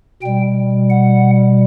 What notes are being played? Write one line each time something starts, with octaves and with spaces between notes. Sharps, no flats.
B2 G3 G5
F#5